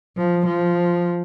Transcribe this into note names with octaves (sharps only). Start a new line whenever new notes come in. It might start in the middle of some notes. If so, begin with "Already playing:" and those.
F3
F3